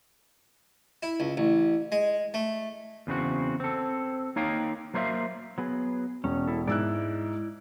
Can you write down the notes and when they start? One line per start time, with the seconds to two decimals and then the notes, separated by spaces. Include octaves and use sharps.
1.03 E4
1.20 C#2
1.37 A1
1.92 G#3
2.34 A3
3.07 E2 C#3 C4 F#4
3.60 C4 A4
4.36 A#3 D#4 C#5 F5 G5
4.94 F#3 A#3 C5 C#5 E5 F5
5.58 F#3 B3 G#4
6.24 E1 C#4
6.47 E4 A4
6.68 G#2 E4 D5 E6 F#6